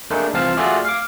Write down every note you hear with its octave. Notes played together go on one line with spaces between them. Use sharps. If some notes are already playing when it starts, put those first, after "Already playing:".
A3 A#3 D4 D#4 G#4
C2 E3 C4 F4 F5 A5
A3 F4 F#4 G#4 D5 E5
F5 D6